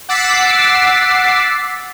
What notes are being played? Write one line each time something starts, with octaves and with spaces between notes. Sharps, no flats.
F#5 D6 E6 A6 B6 C7